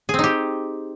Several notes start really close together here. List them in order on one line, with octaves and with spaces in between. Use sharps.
G#4 C4 D#4 G4